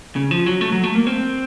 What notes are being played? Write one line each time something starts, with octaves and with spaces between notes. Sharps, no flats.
C#3
F3
F#3
A3
F#3
A3
A#3
C4